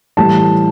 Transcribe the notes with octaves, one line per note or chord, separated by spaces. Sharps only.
A2 E3 G3 A5